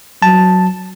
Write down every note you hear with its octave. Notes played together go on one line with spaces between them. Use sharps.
F#3 A5